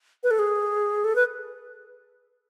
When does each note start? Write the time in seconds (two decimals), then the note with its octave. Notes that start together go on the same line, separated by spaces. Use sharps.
0.23 B4
0.31 A4
0.39 G#4
1.04 A4
1.16 B4